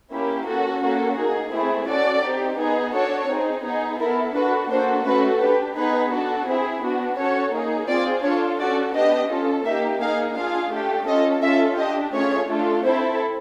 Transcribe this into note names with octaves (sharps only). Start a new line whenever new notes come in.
A#3 C#4 E4 G4
C#4 F#4 A4
A#3 C#4 F#4 A4
A#3 D#4 G#4
A3 C4 E4 G#4
C#4 F#4 A4 D5
C4 D#4 G4
B3 D#4 G#4
D4 F#4 A4 C#5
C4 D#4 G#4
B3 D#4 G#4
B3 E4 A4 A#4
D4 F#4 A4 B4
A#3 D4 F#4 A4 C5
A3 C#4 F#4 A4 B4
D4 G4 B4
B3 D#4 G#4 B4
D4 F#4 A4
C4 E4 G#4
B3 D4 F#4
C#4 F#4 A4 C#5
A#3 D#4 G#4
C4 F4 G#4 D5
D4 F4 A4 C#5
C#4 F#4 A4 D5
B3 D4 G4 D#5
C#4 F4 A4
A#3 D#4 G4 E5
A#3 D#4 G#4 F5
D4 F4 G#4 F5
A3 D4 G4
C#4 F4 A4 D#5
C#4 F4 A4 E5
D4 G4 D#5
A3 C#4 F4 G#4 C#5
A3 D4 F4 A4
C4 E4 A4 C5